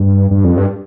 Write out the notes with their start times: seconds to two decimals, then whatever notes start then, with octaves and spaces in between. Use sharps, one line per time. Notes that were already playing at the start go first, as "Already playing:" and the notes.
Already playing: G2
0.31 G2
0.44 F2
0.58 G2